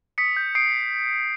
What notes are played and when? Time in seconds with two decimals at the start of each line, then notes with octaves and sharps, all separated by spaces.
0.18 D#6 B6 C#7
0.37 G6
0.55 D#6 C7 D7